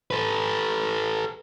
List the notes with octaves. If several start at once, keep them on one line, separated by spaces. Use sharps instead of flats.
A4 B4